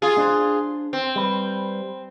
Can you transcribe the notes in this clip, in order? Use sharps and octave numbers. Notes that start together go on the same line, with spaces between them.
F4 G#4
D4 C5
C4
G3 B4